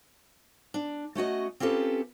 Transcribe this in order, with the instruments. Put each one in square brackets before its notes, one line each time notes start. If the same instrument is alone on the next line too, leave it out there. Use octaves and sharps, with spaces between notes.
[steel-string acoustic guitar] D4
A3 C#4 F#4 D#5
C4 C#4 F4 G4 A4 B4